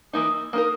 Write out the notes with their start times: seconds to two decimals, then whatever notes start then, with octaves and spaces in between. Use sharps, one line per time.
0.13 E3 A#3 D#4 D#6
0.34 E6
0.53 A#3 D#4 A#4 D#6